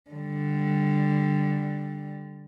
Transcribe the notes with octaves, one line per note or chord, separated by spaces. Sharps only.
D3 G3